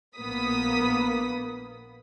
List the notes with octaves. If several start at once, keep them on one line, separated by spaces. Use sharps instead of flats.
A#1 A#3 B3 B5 D#6 B6